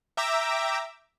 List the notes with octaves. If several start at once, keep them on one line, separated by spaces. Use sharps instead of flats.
E5 G5 A#5 D6 E6